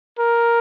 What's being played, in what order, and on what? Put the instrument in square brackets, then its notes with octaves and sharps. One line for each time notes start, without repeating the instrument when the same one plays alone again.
[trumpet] A#4